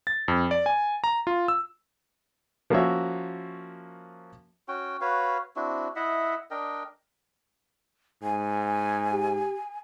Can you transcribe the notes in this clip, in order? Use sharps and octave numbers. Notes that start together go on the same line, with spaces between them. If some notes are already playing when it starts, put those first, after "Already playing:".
A6
F2
D5
G#5
A#5
F4
E6
F3 A#3 C#4 F#4 C#5 E5
C#4 F#4 G5
F#4 B4 C#5 F5
C4 D4 E4 F#4
E4 D#5 E5 F#5
D4 A#4 D#5 G5
G#2 G#5
G4